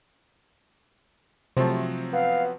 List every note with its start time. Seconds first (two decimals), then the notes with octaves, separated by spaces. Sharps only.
1.57 C3 F3 F#3 A3 C4
2.13 B3 F5